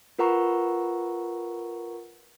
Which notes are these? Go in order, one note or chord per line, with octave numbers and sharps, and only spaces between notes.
F4 A#4 B4 F#5 A#5 C#6